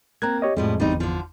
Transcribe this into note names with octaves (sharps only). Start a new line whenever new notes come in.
A#3 C4 A#5 F#6 G#6
G4 C#5 D#5
F2 A2 F3 G3 G#3
G1 E2 G3 C4 D#4
D3 F3